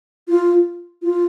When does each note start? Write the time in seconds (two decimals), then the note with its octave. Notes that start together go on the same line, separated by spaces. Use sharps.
0.28 F4
1.03 F4